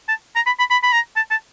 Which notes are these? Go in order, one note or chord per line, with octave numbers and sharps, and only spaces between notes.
A5
A#5
B5
B5
B5
B5
A#5
A5
A5